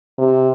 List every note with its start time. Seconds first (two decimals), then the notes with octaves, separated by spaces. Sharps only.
0.18 C3